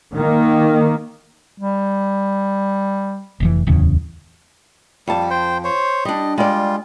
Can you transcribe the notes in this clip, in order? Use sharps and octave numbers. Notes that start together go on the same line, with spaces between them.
D#3 A#3
G3
F1 A#2 E3
D1 E2 C#3
F2 G3 A5
C5 G5
C5 C#5
G3 D4 D#5
G3 G#3 F4 D5